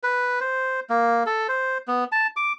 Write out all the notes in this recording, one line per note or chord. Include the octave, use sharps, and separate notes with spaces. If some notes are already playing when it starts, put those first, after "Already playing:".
B4
C5
A#3
A4
C5
B3
A5
D6